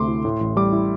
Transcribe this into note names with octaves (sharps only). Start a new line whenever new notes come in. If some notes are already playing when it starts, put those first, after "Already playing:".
Already playing: D2 C3 A3 C6 D6
E4
A2
A1
G3 D6
E4